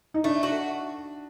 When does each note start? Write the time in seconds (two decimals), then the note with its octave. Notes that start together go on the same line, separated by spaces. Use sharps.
0.14 D#4
0.24 A3 D4
0.43 F#4